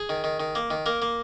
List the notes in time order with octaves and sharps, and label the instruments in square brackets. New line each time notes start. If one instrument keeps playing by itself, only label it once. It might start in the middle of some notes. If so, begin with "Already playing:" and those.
Already playing: [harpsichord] G#4
D#3
D#3
D#3
A#3
D#3
A#3 A#4
A#3